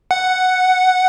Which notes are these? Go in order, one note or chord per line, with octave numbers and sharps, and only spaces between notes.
F#5